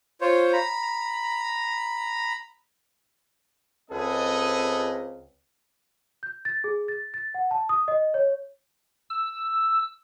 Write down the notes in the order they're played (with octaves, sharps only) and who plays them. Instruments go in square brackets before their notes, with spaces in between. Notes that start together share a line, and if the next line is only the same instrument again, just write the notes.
[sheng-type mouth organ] F4 C5 C#5
A#5 B5
[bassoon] C#2 [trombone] C4 [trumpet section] G#4 B4 D#5 [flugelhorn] A4
[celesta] G6
A6
G#4
A6
A6
F#5
A5
D#6
D#5
C#5
[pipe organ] E6